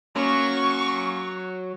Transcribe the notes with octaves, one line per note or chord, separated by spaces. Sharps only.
F#3 A#3 C#4 C#6